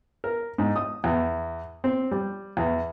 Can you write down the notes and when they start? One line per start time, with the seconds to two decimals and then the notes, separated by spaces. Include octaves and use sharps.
0.24 A#4
0.58 G#2
0.76 D#6
1.04 E2
1.84 C4
2.11 G3
2.57 E2